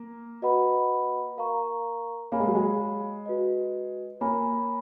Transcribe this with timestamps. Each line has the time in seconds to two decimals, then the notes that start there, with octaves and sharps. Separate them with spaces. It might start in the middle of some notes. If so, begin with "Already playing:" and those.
Already playing: A#3
0.42 F#4 B4 D#5 F#5 B5
1.37 A#4 F5 A#5 C#6
2.32 A#3 G#4 C#5 F5 G#5 B5
2.40 G#3
2.47 F#3
2.55 G#3
3.26 F#4 B4 D#5
4.20 A#3 C#5 G#5 B5